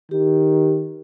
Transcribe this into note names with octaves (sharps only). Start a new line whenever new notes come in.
D#3 G4